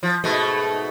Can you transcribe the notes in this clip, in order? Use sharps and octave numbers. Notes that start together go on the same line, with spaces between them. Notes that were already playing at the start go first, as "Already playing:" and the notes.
F3
G#2 B2 A3